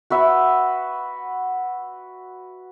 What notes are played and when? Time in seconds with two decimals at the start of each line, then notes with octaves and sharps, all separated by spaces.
0.10 F#4 B4 E5